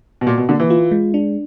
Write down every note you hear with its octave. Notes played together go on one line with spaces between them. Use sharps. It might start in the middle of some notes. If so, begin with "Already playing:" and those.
B2
A#2 F#4
B2
D3 A#3
E3
F4
G#3
D4